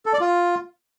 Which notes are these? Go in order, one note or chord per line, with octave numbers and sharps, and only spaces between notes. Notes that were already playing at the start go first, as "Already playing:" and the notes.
A4
D5
F4